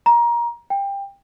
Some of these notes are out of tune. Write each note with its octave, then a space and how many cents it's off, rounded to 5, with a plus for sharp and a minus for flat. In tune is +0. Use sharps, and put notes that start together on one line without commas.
A#5 +20
G5 +20